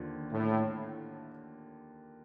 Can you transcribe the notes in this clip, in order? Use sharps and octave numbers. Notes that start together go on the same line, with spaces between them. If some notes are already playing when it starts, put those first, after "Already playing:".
Already playing: D#2 D3 F3
A2